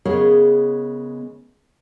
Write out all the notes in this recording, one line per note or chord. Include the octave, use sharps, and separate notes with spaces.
C#3 G#3 B3 G#4 A#4 C#5